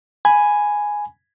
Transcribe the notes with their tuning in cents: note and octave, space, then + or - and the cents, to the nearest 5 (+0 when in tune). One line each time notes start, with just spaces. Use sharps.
G#5 +0 B5 +0